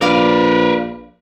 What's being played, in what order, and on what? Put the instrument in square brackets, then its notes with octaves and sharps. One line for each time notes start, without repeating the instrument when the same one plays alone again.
[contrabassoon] A#1 [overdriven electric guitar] A#4 B4 [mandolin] D5 F5 F6